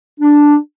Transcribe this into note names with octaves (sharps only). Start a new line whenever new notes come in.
D4